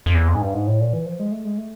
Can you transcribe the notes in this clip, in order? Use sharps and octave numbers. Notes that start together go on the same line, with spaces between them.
F2
E2
F2
G#2
G2
G#2
A2
A#2
E3
F3
G#3
A3
G#3
A3